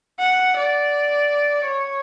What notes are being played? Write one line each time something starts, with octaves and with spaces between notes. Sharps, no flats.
F#5
D5
C#5